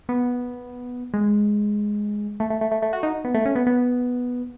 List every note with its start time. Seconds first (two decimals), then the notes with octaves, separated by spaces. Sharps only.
0.09 B3
1.14 G#3
2.40 A3
2.50 A3
2.61 A3
2.71 A3
2.82 A3
2.93 F#4
3.03 D#4
3.24 B3
3.35 A3
3.45 C#4
3.55 B3
3.67 B3